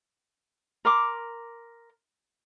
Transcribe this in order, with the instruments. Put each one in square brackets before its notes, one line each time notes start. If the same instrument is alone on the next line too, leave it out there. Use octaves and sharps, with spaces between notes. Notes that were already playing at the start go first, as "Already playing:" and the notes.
[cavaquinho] A#4 C6 D6